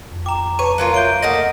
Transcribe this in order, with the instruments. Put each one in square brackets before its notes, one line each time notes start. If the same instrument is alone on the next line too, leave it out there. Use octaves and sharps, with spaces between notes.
[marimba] F2
[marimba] G5 [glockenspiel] A#5 D6
[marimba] B4 A5 [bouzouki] C#5 [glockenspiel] D#7
[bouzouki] F#3 A#3 F4
[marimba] C#5 E5 G6 [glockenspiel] D7 G7
[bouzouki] A3 A#3 D#4 [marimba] D#5 F#5 A#5 [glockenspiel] A#6